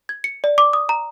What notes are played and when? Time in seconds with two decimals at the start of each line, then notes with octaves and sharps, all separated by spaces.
0.09 G#6
0.24 C#7
0.44 D5
0.58 D6
0.73 D#6
0.89 A#5